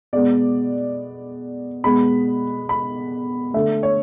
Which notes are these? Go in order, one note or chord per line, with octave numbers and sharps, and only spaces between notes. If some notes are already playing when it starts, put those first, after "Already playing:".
B2 G#3 B3 D5
B2 G#3 B3 B5
B5
D3 A3 E5
C#5